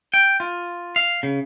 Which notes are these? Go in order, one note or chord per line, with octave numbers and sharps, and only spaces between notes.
G5
F4
F5
C#3